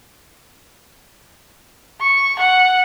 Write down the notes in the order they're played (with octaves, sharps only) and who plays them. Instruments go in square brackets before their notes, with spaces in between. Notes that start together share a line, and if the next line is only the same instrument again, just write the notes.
[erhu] C#6
F#5